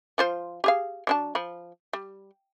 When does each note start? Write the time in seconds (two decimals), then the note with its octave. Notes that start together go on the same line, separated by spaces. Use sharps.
0.18 F3 F4 C5
0.64 G4 G#4 F5
1.07 F#3 D4 A5
1.35 F3 B5
1.93 G3